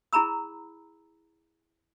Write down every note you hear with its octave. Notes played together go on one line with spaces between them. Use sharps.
E4 G#4 A#5 B5 E6